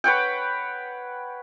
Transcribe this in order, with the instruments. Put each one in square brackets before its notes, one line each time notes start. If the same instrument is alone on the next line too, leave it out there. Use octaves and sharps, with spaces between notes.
[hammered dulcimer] B4 C#5 F#5 G5